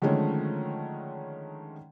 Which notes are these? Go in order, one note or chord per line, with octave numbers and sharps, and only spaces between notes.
D3 D#3 F3 G#3 A3 C#4